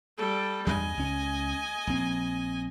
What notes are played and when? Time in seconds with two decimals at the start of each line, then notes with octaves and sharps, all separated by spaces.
0.17 G3 A4
0.67 E2 G2 D#5 G#5
0.97 C#2 C#4
1.87 A#1 C4